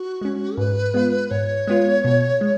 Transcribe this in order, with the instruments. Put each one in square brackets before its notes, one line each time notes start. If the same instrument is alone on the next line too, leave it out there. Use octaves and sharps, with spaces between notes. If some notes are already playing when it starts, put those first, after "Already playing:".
Already playing: [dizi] F#4
[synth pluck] G#3 C#4
[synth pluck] G#2 [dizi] B4
[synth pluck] G#3 B3 F4
[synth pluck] G#2 [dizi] C#5
[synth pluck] G#3 B3 F4
B2
G#3